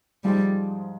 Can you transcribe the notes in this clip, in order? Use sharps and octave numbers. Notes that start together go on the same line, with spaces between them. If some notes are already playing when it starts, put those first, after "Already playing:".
G#2 F3 G3 G#3